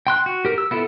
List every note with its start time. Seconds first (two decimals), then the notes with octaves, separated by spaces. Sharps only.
0.07 G5 C6 F#6
0.26 F#4
0.45 G4 A#4
0.58 E6
0.71 B3 E4 F4 A4